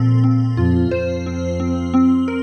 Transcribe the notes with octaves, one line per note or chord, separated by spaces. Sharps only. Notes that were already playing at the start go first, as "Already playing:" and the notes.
Already playing: A#2 F3 C4 A4
C4
F2 F4
F2 C5
C4
C4
C4
A#4